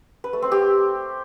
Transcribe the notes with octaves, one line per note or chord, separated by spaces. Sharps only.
B4
A3
C4
G4